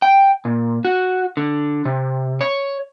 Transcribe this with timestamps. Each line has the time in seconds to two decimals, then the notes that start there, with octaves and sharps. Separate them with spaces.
0.02 G5
0.45 A#2
0.85 F#4
1.37 D3
1.85 C3
2.41 C#5